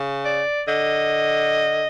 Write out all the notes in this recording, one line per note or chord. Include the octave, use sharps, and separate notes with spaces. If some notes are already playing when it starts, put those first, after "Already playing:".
Already playing: C#3
D5
D3 D#5